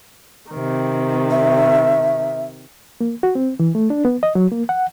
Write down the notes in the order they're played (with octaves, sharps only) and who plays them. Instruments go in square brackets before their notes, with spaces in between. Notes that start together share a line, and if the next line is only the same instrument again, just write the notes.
[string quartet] C3 D#3
[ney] E5
[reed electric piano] A#3
F#4
C4
E3
A3
D4
B3
D#5
F#3
A#3
F#5